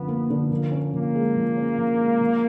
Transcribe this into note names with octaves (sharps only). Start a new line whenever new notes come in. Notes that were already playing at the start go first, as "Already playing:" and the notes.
Already playing: F#2 D3 F3 B3
A#3
D3
F3 A#3
C#4
F3 A#3
G#3
F3
C#4
F3
G#3
F3